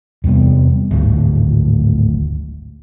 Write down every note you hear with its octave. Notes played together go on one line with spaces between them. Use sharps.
E2 C3 G3 B3
D1 G#1 D2